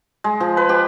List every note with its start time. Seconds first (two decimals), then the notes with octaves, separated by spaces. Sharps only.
0.24 G#3
0.40 F3
0.57 B4
0.69 G4